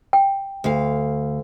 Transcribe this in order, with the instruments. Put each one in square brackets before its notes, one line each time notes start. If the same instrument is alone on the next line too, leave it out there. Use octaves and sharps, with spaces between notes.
[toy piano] G5
[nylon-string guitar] D2 F5